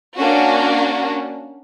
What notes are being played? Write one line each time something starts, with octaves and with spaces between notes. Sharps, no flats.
A#3 C#4 D4 F#4